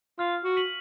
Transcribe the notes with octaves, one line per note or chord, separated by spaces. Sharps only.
F4 F6
F#4
B6 D#7 F#7